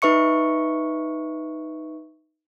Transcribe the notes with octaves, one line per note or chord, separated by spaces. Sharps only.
D#4 B4 E5 C#6 C#7